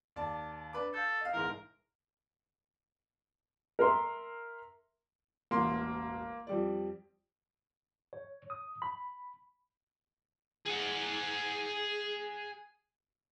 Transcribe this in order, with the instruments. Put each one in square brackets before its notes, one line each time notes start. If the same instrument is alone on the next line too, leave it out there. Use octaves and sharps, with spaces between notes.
[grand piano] D#2 D5 A5
D4 B4 D6
[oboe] A4 [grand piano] F5 G6
[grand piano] D#5 F5
[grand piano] B1 G#2 E3 [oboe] A#4
[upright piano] A#4 E5 C6
[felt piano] E1 A1 C#4 [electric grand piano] A#3 C6
[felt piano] F2 G3 D5
[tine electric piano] C#5
D#6
B5
[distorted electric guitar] G#4 F#5